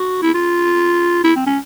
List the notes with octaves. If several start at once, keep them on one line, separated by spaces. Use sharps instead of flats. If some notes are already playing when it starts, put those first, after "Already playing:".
Already playing: F#4
E4
F4
E4
C4
C#4